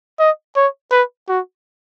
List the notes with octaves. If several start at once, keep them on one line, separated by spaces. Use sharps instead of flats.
D#5
C#5
B4
F#4